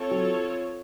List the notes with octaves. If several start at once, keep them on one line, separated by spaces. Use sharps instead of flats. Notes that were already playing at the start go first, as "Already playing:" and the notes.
Already playing: C4 F4 A4 C#5
F#3